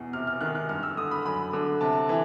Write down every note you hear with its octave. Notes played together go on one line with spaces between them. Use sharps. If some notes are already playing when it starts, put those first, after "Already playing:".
Already playing: E2 B2
C3 F6
F6
D#3 F#6
F#6
G2 F6
E6
D3 D#6
B5
F#2 B5
D3
C3 A5
E3